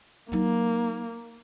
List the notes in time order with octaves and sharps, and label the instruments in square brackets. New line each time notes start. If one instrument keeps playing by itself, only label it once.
[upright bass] F#3 D#4 [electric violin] A#3